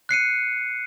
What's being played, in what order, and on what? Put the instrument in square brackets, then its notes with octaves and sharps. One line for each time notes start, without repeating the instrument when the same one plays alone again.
[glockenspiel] F#6 C7 C#7 D#7